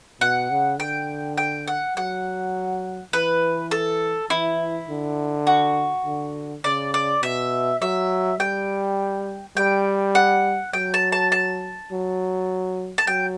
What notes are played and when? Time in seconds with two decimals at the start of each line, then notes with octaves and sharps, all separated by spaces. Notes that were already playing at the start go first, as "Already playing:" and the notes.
0.21 B2 F#5
0.51 C#3
0.79 D3 G5
1.38 G5
1.68 F#5
1.97 F#3 F#5
3.13 E3 B4
3.71 A4
4.30 E3 E4
4.89 D3
5.47 F#4
6.05 D3
6.64 C#3 D5
6.94 D5
7.22 B2 E5
7.82 F#3 E5
8.40 G3 G5
9.57 G3 G5
10.15 F#5
10.73 F#3 G5
10.94 A5
11.12 A5
11.32 A5
11.91 F#3
12.98 A5
13.07 F#3 G5